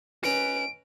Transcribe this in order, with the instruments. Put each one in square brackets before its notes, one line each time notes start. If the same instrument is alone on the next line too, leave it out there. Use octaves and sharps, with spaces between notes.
[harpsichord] C#4 B4 D#5 [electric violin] D7